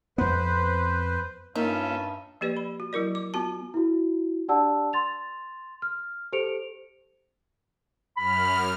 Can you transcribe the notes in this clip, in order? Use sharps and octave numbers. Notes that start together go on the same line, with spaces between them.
F2 B3 B4 C5
G2 A#3 C#4 D#4 F4 E5
F3 A#3 G4 B4 D5
B5
F#4
F#3 E4 A#4 D5
D6
B3 F4 F#4 A5
E4 F#4
D4 G4 D5 F#5 A5 E6
C6 A6 F7
F6
G4 A4 C5 C#7 D7 F7
F#2 B5 F6